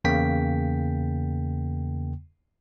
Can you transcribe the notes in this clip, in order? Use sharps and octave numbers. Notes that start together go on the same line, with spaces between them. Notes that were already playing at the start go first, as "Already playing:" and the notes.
E2 C#3 A#3 G5 B6